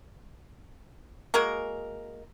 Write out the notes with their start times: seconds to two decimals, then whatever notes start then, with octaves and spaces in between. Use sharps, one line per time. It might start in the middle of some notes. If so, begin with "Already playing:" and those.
1.34 G#3 A#3 F#4 A#4